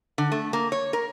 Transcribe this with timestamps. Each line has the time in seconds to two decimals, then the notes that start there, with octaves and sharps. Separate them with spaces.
0.18 D3
0.32 A3
0.53 A#3
0.72 C#5
0.93 A#4